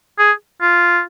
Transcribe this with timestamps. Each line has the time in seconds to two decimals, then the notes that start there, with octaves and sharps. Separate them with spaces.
0.19 G#4
0.61 F4